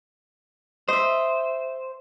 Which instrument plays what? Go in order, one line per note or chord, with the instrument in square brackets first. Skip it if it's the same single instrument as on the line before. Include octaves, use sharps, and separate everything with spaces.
[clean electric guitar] C5 [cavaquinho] D#5 E5